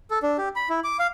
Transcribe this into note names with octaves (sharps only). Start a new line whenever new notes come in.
A4
D4
G4
B5
E4
D6
F5